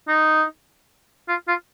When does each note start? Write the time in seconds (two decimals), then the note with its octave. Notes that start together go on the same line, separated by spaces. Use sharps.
0.08 D#4
1.28 F4
1.48 F4